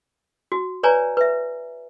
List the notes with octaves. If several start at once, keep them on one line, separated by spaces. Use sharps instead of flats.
F#4
B4 C#5 D5 G#5 A#5
B4 E5